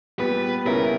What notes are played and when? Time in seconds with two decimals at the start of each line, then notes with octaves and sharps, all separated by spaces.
0.19 A#2 G3 B3 B4
0.66 C#2 B2 G3 C#4 E4 A#4